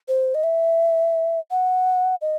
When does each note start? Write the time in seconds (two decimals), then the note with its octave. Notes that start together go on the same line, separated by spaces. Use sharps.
0.08 C5
0.35 D#5
0.44 E5
1.51 F#5
2.22 D#5